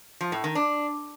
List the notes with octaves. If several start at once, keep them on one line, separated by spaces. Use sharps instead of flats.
F3
A2
D#3
D4